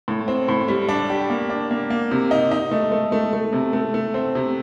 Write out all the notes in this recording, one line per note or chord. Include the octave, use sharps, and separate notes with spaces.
A2
C4
A2
G3
D4
G4
A#3
D4
A#3
A#3
C3
D#4
D#4
A3
A3
A3
A3
C3
A3
A3
C4
C3